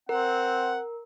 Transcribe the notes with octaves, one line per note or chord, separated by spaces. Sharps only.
C4 A#4 F#5